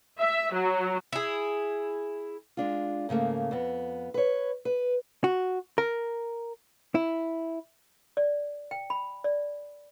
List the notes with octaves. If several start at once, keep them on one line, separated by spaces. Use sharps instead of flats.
E5
F#3
E4 G#4
G#3 D4 F4
G#2 C#3 A3 A#3
F2 B3
B4 C#5
B4
F#4
A#4
E4
D5
G5
B5
D5